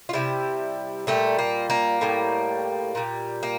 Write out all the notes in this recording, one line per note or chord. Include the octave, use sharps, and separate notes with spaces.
F4
C3 E3 G3 E4
A#2 G3 A3
A#3
A#3
A2 G3
A#2 G3
A#3